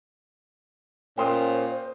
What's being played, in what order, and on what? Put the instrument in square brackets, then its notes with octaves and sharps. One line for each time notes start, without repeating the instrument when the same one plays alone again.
[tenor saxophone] A#2 [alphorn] C#4 [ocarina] C5 [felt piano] G5 C6 D#6